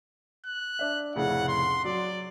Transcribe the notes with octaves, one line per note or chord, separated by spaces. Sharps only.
F#6
D4 E5
F1 A2 C#3 F#5
C6
F#3 D5